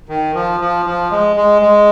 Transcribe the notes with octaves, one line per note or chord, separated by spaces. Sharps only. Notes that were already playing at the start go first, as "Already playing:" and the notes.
D#3
F3
F3
F3
G#3
G#3
G#3